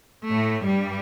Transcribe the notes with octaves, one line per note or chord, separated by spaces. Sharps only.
A2 A3
G2 G3